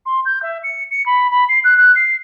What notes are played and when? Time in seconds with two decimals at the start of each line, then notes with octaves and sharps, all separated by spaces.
0.06 C6
0.26 G6
0.43 E5
0.64 C#7
0.91 C#7
1.06 B5
1.31 B5
1.49 C7
1.64 F#6
1.78 F#6
1.96 C7